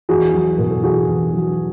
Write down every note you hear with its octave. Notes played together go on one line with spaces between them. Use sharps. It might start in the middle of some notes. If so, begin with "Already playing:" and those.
E2 F#4 G#4
F#3
B2 A#4
A4
E2 F#4 G#4
E2
F#3